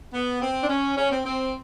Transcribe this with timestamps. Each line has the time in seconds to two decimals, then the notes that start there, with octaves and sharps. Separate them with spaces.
0.13 B3
0.40 C4
0.62 D4
0.69 C#4
0.97 C#4
1.11 C4
1.25 C4